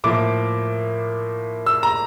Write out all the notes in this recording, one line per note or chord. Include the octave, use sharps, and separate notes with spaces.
A2 F3 A#3 D6
E6
A#5